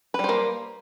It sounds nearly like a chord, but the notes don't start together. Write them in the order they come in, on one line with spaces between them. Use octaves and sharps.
B4 G3 C5 A#3